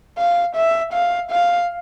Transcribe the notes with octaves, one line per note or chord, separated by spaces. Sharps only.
F5
E5
F5
F5